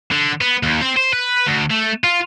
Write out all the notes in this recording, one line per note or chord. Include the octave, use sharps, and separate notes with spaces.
D3
B3
D#2
C4
C5
B4
D2
A3
F4